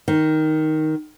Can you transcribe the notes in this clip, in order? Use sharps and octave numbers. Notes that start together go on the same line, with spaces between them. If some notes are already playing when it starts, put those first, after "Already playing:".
D#3